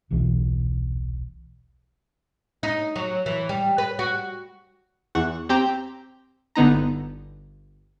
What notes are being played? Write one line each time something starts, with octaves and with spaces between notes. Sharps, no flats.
D#1 B1 B2 E3
D#4
F#3
E3
G3
B4
F#4
E2 E3 F#5 C#6
C4 G4 C5 G5 A#5
G1 D3 B3 D#4 A#5